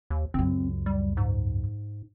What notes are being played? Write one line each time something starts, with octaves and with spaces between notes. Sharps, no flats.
D#2
C#2 F#2 C4
G3
G#2